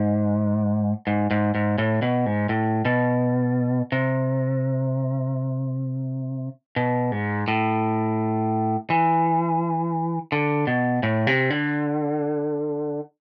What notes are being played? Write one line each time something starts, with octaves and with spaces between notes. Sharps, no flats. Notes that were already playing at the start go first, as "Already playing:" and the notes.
Already playing: G#2
G#2
G#2
G#2
A2
B2
G#2
A2
B2
C3
B2
G#2
A2
E3
D3
B2
A2
C3
D3